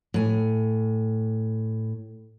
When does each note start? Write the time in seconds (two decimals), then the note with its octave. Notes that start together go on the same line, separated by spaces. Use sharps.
0.14 A2 G#5